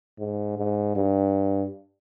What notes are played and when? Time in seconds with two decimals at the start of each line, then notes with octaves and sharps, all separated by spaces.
0.19 G#2
0.58 G#2
0.96 G2